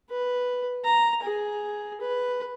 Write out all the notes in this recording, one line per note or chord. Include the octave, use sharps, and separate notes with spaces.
B4
A#5
G#4
B4